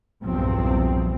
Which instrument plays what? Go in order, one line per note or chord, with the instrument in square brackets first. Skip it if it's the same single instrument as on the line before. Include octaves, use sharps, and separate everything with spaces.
[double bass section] B1 E2 G2 A#2 F3 C4